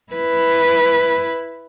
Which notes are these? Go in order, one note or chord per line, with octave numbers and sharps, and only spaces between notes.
E4 B4